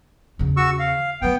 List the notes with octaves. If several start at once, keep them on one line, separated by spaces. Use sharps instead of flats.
E2 C#3
F#4 C#6 E6
F5
F#3 A3 B3 G5